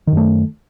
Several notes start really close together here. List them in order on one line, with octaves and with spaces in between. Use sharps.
D#3 F#2 A3